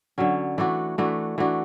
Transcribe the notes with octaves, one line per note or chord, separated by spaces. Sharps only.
D3 F#3 C#4
E3 A3 D4 F#4
E3 A3 D4 F#4
E3 A3 D4 F#4